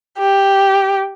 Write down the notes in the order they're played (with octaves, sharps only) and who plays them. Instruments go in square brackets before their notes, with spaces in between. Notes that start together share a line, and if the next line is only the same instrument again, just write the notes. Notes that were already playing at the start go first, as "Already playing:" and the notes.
[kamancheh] G4